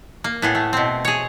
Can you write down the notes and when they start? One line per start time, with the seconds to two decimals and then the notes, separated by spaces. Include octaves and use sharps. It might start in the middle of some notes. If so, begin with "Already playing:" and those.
0.24 A#3
0.42 A2 B3 G#4 A4
0.55 A3
0.73 B2 C4
1.05 G#4 C#5